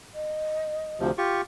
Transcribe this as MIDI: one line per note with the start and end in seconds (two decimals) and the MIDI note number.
0.14 1.00 75
1.00 1.11 38
1.00 1.11 48
1.00 1.11 53
1.18 1.42 65
1.18 1.42 67
1.18 1.42 85